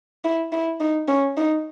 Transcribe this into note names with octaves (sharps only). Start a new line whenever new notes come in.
E4
E4
D#4
C#4
D#4